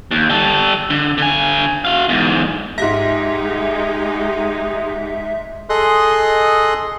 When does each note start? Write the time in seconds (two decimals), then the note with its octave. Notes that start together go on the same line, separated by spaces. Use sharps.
0.11 D#2
0.30 G3 A4
0.90 D3
1.18 D3 G#5
1.85 F#4 F5
2.09 E2 G#2
2.78 G#2 G#3 D#4 G4 E5 A#6
5.69 G#4 A4 D#5 C6 D#6 F#6